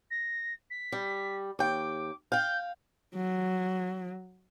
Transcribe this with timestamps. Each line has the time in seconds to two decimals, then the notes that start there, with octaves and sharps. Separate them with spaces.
0.11 A#6
0.70 B6
0.92 G3
1.59 D#2 G5 D6
2.32 F5 G5 G6
3.16 F#3